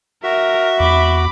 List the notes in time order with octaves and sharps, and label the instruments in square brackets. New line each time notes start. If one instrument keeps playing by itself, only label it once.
[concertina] F#4 [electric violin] A#4 [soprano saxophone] E5
[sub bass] E2 [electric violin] B5 D6